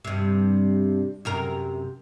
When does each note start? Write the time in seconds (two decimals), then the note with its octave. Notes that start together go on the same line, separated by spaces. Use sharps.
0.05 G2 C3
1.25 F#2 C3 A#4